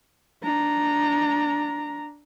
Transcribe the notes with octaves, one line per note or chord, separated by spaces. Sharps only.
D4 A#5